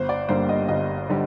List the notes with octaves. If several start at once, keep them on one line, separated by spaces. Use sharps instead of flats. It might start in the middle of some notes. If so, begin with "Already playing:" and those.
Already playing: G1 C5
D5
G2 D3 G3 A#3 C5
D#5
G1 D#5
D3 G3